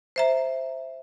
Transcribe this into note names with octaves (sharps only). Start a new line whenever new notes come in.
C5 E5 A#5